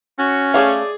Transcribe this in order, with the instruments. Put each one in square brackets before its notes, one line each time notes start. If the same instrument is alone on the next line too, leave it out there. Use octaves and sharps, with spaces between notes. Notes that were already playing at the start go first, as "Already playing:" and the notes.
[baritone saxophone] C#4 [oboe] F#4
[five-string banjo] A3 C#5 F5 [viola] G#4 [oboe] D5